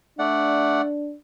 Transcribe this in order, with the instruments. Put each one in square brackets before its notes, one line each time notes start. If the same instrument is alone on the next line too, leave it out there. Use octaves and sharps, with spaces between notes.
[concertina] A3 D5 F#5 [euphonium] D4